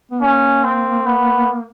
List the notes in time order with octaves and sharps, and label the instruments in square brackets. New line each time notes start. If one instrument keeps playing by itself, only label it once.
[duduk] B3
[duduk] A#3 [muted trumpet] C#4
[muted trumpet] C4
B3